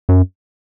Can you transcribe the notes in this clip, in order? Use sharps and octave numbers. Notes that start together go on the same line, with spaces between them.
F#2